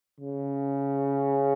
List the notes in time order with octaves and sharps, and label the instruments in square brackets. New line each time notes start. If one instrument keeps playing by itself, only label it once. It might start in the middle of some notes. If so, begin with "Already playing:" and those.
[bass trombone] C#3